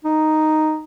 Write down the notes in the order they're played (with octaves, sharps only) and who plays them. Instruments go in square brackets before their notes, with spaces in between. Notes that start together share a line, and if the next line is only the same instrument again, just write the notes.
[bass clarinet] D#4